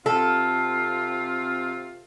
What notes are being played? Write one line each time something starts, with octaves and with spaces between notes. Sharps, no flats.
C3 C4 F4 A4